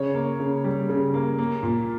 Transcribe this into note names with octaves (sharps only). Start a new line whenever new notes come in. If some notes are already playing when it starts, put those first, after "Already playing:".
Already playing: C#3 C#5
A#3
C#3
G3
C#3
A#3
A#3
A#2